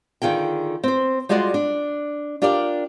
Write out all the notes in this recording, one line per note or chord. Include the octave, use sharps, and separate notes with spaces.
D3 D#3 F4 G#4 G5
C4 C5
G3 G#3 F4 F#4 D5 F#5
D4
D4 F4 G4 A#4 D5